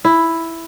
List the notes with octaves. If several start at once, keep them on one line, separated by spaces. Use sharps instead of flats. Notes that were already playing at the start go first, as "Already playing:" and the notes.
E4